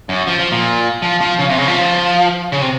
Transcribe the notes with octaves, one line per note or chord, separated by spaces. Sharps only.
F#2
F3
F3
A#2
F3
F3
C#3
C3
C#3
F3
C#3
C3